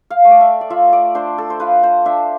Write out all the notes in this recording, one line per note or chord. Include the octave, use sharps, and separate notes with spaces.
F5
A3
D5
E5
D5
F4 E5
D5
D4 C5
A4
C5
F4 B4
C5
D4 E5